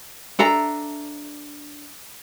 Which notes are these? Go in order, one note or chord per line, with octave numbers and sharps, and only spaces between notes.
D4 A4 E5 A#5